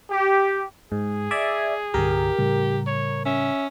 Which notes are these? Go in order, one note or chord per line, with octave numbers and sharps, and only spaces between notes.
G4
G#2 G#4
D5 E5 G#6
C2 G2 D3 G4 A#4
A2 C#3 G3
C#5
C#4 E5